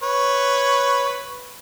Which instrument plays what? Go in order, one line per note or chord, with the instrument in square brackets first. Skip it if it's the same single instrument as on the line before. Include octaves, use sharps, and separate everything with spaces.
[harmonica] B4 C#5